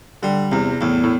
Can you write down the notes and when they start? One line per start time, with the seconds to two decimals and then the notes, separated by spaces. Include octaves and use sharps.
0.22 D3 G3
0.52 E2 C3
0.81 E2 A2
1.04 A2